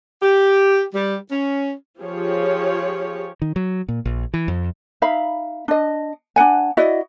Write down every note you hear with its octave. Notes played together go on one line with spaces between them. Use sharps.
G4
G3
C#4
F3 G4 G#4 C#5
D#3
F#3
A#2
A#1
E3
F2
D#4 E5 F5 B5
D4 D#5
D4 D#4 F#5 G#5
E4 F#4 D5 D#5